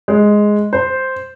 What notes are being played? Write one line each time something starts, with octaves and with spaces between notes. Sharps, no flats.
G#3
C5